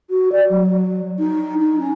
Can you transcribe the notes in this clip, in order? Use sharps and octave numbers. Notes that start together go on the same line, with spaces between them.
F#4
D5
F#3
D#4
D#4
C#4